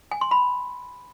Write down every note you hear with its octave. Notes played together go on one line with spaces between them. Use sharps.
G#5
C6
B5